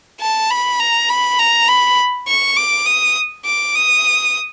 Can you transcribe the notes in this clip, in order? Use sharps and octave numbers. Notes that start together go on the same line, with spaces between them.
A5
B5
A#5
B5
A#5
B5
C#6
D6
D#6
D6
D#6